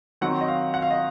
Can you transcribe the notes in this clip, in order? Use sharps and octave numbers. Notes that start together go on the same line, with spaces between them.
D#3 F#3 C4 D#4 F#5
D#5
F5
F#5
F5
D#5